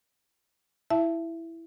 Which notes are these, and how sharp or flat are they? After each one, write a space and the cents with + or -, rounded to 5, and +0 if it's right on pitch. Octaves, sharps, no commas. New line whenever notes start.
E4 +0 E5 +25 A5 +0